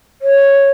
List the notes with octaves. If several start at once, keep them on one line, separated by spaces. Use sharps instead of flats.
C#5